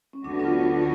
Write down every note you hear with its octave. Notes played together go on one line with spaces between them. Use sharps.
C#4
D2 D3 F#3 B3 D4 F#4
D4
F4